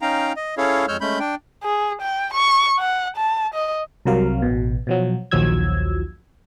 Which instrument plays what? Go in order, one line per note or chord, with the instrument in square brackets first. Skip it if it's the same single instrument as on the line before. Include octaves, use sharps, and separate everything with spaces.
[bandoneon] C#4 D#4 F5 G5 A#5
D#5
C#4 E4 G#4 A4 C#5 F5
F2 G#3 C#5 E6 F6 G6
G#3 A3 C#4 B5 G6
D4 G5
[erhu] G#4
G5
C#6
F#5
A5
D#5
[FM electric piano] C2 C3 F#3 A#4 F5
A1 B2
B2 F3 F#3
A#1 D#2 F3 F#3 E6 G#6